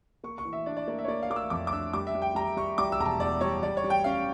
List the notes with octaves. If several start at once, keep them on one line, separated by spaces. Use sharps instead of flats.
A#3 C#6
C#6
E3
E5
D4 D5
D5
A#3 D5
E5
C#5
A#3 D5
F5
A#3 D6
E6
F2 D6
D6
D4 E6
G3 D6
E5
G3
G5
G3 A#5
G3 C#6
G3 D6
E6
E1 A#5
A5
E2 D5
G3 C#5
G3 D5
C#5
G3
G5
C#4 F5